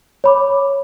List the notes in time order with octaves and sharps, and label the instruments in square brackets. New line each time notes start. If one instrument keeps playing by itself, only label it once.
[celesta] C#5 B5 D6